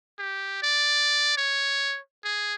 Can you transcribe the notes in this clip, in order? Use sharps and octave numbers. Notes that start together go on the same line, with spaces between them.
G4
D5
C#5
G#4